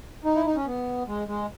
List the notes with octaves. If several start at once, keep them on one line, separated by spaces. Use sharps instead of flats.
D#4
E4
D#4
C#4
B3
G#3
G#3